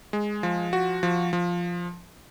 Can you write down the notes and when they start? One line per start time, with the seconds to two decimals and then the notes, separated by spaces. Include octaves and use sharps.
0.13 G#3
0.43 F3
0.73 F#4
1.03 F3
1.33 F3